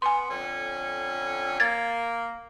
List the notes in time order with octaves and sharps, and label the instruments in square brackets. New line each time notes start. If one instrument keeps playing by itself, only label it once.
[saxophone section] B3 [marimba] G#5 C6
[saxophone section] F2 D3 C#4
[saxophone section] A#3 [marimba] G#6 A6